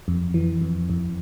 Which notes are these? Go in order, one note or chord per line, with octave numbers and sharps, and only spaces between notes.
F2
E3
F2
F2